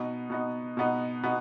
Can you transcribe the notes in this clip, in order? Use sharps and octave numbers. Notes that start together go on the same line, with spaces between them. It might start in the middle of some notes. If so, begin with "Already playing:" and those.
Already playing: B2 B3 D#4
B2 B3 D#4
B2 B3 D#4
B2 B3 D#4